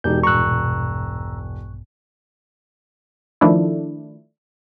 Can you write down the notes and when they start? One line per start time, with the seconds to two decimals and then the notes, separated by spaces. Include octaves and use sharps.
0.04 E1 D#4 G4 G6
0.23 A#1 G2 B2 A#5 C#6 E6 F#6
3.41 D#3 F3 A3 D4 E4